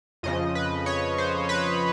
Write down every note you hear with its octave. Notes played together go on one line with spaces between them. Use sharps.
F2 C#3 F3 D#5
B4
C#5
C5
B4